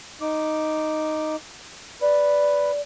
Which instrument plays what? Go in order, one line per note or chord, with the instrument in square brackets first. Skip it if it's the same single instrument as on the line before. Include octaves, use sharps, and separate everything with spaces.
[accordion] D#4 D6
[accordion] B4 [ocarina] D5